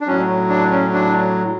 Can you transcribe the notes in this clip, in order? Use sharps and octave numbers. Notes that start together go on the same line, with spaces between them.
D4
A2 F#3 C#4
D4
C#4
D4